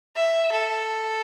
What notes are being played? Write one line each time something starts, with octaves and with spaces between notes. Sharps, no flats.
E5
A4